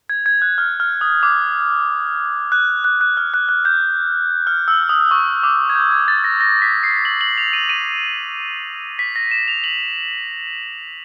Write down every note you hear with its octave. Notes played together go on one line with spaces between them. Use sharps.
G#6
G#6
F#6
F6
F6
D#6
D6
F#6
F#6
F#6
F6
F#6
F#6
G6
F6
E6
D#6
C#6
D6
G#6
G6
G#6
A6
A#6
A#6
B6
C7
F#7
F#7
F7
D#7
D#7
B6
A#6
E7
F7
F#7